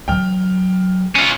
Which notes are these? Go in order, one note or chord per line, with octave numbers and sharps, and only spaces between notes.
E3 F#3 G5 F6
C#4 F4